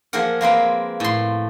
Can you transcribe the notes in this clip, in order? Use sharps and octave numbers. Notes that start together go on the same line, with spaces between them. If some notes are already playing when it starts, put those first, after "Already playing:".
F3 A#3 G#4 A#4 F#5
G#3 A#3 C4 B4
A2 C6